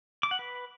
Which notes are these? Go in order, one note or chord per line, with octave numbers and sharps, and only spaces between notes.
D6
F#5
B4